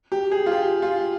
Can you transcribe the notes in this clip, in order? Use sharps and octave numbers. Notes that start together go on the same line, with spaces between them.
G4
G#4
F4
G4
F4